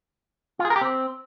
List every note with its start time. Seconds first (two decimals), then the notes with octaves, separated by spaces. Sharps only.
0.59 F4
0.65 G#4
0.70 A#4
0.76 G4
0.81 C4